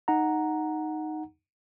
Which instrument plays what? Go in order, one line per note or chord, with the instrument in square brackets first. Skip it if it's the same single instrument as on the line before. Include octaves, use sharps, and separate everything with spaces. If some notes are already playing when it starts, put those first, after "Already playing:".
[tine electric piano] D#4 F#5 A#5